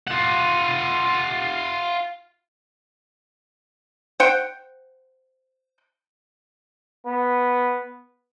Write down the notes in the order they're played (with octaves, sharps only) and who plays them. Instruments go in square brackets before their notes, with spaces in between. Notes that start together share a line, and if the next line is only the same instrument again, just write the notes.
[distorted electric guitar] F4 F#5
[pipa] C5 F#5 G5
[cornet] B3